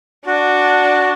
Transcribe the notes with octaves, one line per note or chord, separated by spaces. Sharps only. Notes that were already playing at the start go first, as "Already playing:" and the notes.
D4 F#4